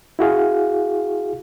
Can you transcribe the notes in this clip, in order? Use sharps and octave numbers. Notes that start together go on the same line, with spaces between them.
E4 F#4 G#4 F5